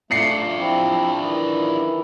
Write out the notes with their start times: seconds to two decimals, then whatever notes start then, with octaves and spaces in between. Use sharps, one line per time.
0.11 A3 D4 F4 C7 C#7
0.59 F3 C4 E4
1.21 D#3 E3 E4